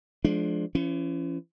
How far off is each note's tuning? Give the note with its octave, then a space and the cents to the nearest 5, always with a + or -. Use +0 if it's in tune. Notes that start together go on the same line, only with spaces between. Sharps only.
F3 +0 G#3 +35 D4 +0
E3 +45 C#4 +5